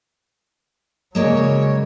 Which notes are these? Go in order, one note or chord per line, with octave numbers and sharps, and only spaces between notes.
C#3 F#3 G#3 A#3 C#5 D5